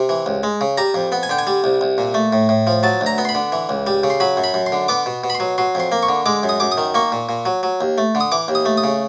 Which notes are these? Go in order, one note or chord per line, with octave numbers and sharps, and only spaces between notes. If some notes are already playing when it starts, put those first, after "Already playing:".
Already playing: C3
E3
C#2
G#3
C#3
G3 A#5
F2
B3
G#5
D3 G5
G#5
G3
C2
C2
A#2
A3
A2
A2
F3
F#3 A5
D2
A#5
B3
C6
B5
D3
E3
C#2
G3
C#3
C6
F#3 B5
F#2
B5
F#2
C6
D3
B3 D6
B2
B2
B5
C6
F#3
F#3 C6
F2 C6
A#3
C#6
D3
G#3 D6
F#2
D#6
F#2 D6
D#6
D#3
A#3 C#6
A#2
A#2
F#3
F#3
D#2
A3
D3
D#6
E3 D6
D#2
D#6
A3
D#6
C#3